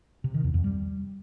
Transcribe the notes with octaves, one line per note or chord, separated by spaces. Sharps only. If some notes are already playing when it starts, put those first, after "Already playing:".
C3
D#3
E2
F2
G3